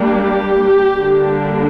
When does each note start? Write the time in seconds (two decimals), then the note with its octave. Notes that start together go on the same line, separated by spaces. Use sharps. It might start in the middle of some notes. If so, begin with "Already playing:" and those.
Already playing: G3 A#3 D4
0.15 G4
0.99 D3 G3 A#3 D4